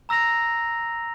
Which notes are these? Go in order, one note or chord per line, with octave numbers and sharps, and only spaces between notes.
A#5 E6 A#6 F7